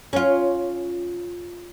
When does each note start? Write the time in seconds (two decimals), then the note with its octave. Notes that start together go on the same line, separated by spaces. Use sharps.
0.13 C#4 F4